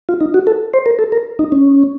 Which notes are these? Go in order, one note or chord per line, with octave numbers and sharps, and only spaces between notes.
F4
D#4
F#4
A4
C5
A#4
A4
A#4
D#4
C#4